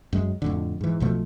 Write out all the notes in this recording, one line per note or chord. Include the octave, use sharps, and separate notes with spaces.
F#2 G#3
F2 A2 D3
G#2 E3
B1 B2 F3 A3